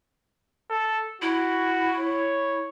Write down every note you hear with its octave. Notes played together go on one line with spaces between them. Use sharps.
A4
E4 F#4
C#5